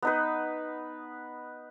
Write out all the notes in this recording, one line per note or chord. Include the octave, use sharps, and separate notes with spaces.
B3 D#4 B4